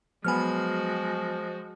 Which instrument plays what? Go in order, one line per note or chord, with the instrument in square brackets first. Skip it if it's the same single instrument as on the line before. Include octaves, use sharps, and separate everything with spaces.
[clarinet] F3 [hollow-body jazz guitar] F#3 B3 B4 [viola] G#3 F#4 [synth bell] G#5 F6